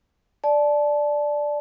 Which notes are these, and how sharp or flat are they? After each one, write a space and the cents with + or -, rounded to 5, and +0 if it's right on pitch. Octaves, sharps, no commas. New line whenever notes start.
D5 +0 A5 -25